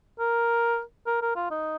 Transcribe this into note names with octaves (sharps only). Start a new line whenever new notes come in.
A#4
A#4
A#4
F4
D#4